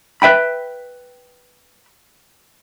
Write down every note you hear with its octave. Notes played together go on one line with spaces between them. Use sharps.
B4 E5 G5 B5